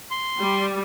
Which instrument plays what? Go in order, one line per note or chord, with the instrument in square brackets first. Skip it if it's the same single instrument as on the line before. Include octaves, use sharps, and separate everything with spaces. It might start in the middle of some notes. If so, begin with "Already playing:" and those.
[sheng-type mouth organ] C6
[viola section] G3